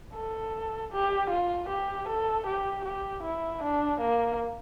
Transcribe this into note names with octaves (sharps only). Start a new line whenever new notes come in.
A4
G4
F4
G4
A4
G4
G4
E4
D4
A#3